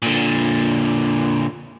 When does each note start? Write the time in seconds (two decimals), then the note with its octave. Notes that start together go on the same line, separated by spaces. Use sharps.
0.02 A#2 D3